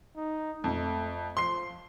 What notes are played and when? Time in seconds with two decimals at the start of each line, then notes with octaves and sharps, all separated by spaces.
0.16 D#4
0.64 F2 A3
1.37 F3 C6 C7